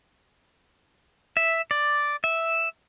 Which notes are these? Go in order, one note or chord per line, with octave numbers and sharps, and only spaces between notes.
E5
D5
E5